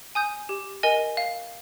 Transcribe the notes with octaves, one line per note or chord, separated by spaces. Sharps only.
G#5 D#6 G6
G4
A#4 D#5 G#5
F5